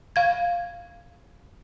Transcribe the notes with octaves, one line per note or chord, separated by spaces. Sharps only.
F5 G#6